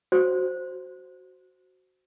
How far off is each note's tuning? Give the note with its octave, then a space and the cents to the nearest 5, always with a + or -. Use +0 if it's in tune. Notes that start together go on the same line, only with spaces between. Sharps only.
F#4 +0 C5 +0